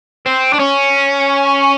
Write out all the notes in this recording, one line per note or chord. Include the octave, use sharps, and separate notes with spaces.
C4
D4
C#4